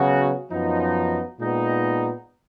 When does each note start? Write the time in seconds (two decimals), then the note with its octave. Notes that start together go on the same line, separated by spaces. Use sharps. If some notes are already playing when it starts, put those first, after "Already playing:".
Already playing: C#3 F#3 B3 F#4
0.50 F#2 F3 B3 D#4
1.39 A#2 G#3 B3 D#4